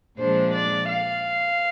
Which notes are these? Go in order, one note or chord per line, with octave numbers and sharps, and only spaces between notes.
A#2 F3 G#3 D4 C5
D5
F5